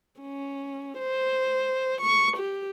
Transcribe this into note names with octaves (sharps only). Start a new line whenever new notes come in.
C#4
C5
C#6
G4